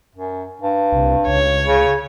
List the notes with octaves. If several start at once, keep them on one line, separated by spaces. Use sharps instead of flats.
F#2
G2
C2
C#2 C#5
C#3